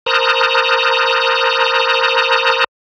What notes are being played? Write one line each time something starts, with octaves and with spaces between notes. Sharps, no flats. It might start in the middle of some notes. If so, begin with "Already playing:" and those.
A#4 C5 A5 A#5 D#6 F#6